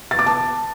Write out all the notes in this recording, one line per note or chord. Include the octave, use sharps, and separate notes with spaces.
A6
D6
A5